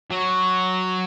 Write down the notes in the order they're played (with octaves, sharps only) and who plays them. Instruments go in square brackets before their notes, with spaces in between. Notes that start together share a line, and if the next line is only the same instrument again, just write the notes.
[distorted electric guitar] F#3